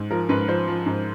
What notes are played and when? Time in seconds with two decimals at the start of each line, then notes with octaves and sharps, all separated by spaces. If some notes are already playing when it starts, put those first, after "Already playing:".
Already playing: G#2
0.10 F3 A#4
0.29 G#2 B4
0.48 F3 C5
0.68 F3
0.86 G#2